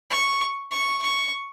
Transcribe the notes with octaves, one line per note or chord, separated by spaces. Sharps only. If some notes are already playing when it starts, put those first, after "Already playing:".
C#6
C#6
C#6